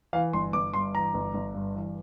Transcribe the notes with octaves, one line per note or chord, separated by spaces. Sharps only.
E3 F5
G1 C6
G1 D6
G2 C6
E3 A#5
G1
G1
G2
E3